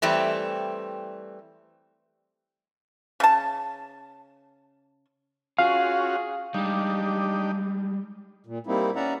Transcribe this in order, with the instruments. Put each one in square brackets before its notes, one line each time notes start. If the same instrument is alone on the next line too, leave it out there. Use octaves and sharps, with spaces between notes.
[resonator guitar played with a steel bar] E3 G3 A3 C4
[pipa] C#3 A5
[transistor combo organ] C#4 F4 F#4 [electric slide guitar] G#4 [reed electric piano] F5
[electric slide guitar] G3 G#3 [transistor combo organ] D4 D#4 G4
[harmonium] A#2
G3 A#3 C4 D#4 E4
C#4 D5 E5 F#5 A#5